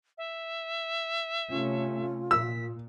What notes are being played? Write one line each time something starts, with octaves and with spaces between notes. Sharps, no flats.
E5
C3 A3 C#4 F4
A#2 E6 B6